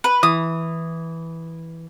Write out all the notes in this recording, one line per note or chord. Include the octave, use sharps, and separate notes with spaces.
B4
E3 D#6